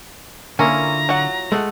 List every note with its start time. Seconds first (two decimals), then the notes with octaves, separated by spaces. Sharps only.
0.59 D3 A#3 C#4 E4 F4 A#5
1.09 F#3 F#5
1.52 G#3 A3 A4 D#5 F#5